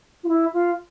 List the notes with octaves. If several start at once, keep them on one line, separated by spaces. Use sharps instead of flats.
F4
E4
F4